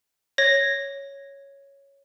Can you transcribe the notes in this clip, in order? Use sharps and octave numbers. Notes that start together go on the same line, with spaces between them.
C#5 A#6